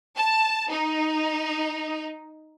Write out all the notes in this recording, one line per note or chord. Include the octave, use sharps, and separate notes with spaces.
A5
D#4